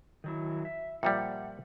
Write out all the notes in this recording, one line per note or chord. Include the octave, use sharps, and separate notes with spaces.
D#3 F#3 E4
E5
A#2 F3 G3 E5 F#5 G5